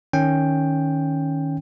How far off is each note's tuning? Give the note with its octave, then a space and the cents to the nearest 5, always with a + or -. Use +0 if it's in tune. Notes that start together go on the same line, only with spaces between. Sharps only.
D#3 +0 C#4 +0 G5 +5